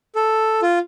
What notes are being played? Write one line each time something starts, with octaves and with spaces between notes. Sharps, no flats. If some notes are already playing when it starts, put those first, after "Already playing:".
A4
F4